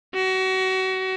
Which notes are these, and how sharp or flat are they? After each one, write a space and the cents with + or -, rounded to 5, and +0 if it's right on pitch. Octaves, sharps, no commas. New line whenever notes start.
F#4 +30